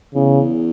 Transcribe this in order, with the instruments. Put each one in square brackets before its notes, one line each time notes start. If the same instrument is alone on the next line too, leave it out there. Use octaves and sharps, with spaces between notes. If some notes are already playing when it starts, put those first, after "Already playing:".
[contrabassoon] E2 [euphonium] C#3